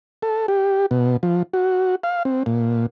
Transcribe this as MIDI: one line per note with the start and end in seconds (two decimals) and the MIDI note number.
0.22 0.46 69
0.48 0.86 67
0.91 1.17 47
1.23 1.43 53
1.54 1.95 66
2.03 2.23 77
2.25 2.43 60
2.46 2.86 46